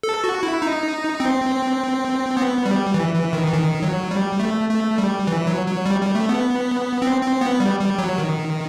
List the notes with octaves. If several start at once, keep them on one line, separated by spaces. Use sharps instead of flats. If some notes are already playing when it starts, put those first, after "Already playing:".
A4
F#4
E4
D#4
C4
B3
G3
E3
E3
D#3
E3
D#3
F#3
G3
A3
A3
G3
E3
F#3
F#3
G3
G3
A3
B3
C4
C4
B3
G3
G3
F#3
D#3